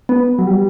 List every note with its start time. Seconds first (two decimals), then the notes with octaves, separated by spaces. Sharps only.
0.09 B3
0.39 F#3
0.47 G3